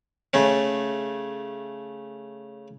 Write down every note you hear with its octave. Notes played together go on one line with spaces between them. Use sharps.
C#3 A3 C#4